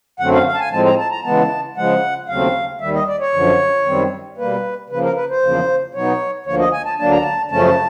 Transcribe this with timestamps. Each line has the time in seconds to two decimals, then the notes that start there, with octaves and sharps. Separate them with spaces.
0.20 F#2 D3 F#3 A3 C4 F#5
0.33 F5
0.47 F5
0.54 A5
0.60 G#5
0.72 A2 F3 G#3 C4 A5
0.86 A#5
0.99 A5
1.11 A#5
1.24 C#3 E3 G#3 B3 A5
1.76 C#3 F3 G#3 F#5
2.28 D#2 C#3 F#3 A3 C4 F5
2.81 D#2 D#3 G3 E5
2.94 D#5
3.07 D5
3.20 C#5
3.34 F#2 D3 F3
3.86 F#2 D#3 G3 C4
4.37 B2 G3 A#3 B4
4.90 C#3 F3 A#3 B4
5.03 A#4
5.16 B4
5.30 C5
5.42 E2 C#3 F3 A#3
5.94 B2 F#3 B3 D#4 C#5
6.46 D2 D3 F3 A#3 C#5
6.59 D#5
6.73 G#5
6.85 A5
6.99 D2 D3 F#3 A#3 D4 A5
7.12 A#5
7.22 A5
7.51 F#2 C#3 F3 A3 C#4 A5